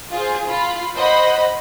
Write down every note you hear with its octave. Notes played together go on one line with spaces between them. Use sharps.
F4 G#4 C5
F4 B5
C5 D#5 F#5 B5